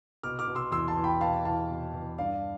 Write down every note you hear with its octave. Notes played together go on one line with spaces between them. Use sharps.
B2 D6 F6
D6 F6
B2
C6 E6
E2 C6 E6
A5 C6
E2
G5 B5
B2 F5 A5
E2 F5 A5
B2
E2
G2 D5 F5